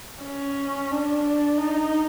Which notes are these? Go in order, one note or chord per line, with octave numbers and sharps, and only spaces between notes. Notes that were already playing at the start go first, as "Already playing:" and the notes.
C#4
D4
D#4